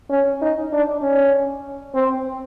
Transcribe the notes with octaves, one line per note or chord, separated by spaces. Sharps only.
C#4
D#4
D4
C#4
C4